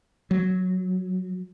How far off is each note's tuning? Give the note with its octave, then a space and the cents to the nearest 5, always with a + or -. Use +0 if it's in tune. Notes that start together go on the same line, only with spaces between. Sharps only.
F#3 -5